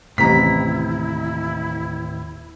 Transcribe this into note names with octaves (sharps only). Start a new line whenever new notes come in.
A1 D#2 A2 C3 E4 A#5 B6